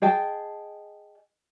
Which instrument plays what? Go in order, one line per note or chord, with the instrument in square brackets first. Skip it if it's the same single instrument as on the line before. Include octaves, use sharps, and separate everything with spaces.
[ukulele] G#4 D#5 G5 A5